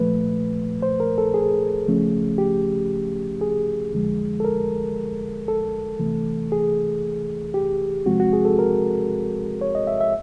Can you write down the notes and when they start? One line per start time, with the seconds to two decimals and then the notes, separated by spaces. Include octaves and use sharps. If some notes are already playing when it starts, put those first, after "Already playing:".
Already playing: A#2 F3 A3 B4
0.83 C5
1.00 A#4
1.18 A4
1.34 G#4
1.86 C#2 C#3 F3 A3 C#4
2.38 G4
3.41 G#4
3.93 F2 D3 F3 G#3
4.40 A4
4.45 A#4
5.48 A4
5.99 C3 E3 A3
6.52 G#4
7.54 G4
8.06 E2 C3 F3 G#3 C4 F#4
8.20 F#4
8.33 G#4
8.45 A4
8.59 A#4
9.61 C#5
9.75 D#5
9.87 E5
10.01 E5